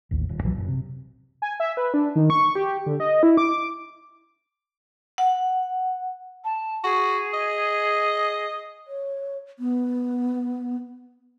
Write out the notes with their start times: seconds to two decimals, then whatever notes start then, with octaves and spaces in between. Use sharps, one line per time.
0.11 A1 D#2
0.29 D#1
0.43 B1 A#2 E3 F#3
0.56 F#1
0.68 C3
1.42 G#5
1.60 E5
1.77 B4
1.94 D4
2.16 D#3
2.30 C#6
2.55 G4
2.86 D3
3.00 D#5
3.23 E4
3.37 D6
5.18 F#5
6.44 A5
6.84 F#4 G#4
7.34 D#5
8.87 C#5
9.59 B3